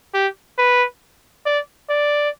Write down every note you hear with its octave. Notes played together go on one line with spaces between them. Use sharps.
G4
B4
D5
D5